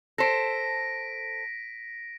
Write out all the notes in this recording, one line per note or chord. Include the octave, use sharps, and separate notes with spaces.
A4 C5 A#6 B6 D7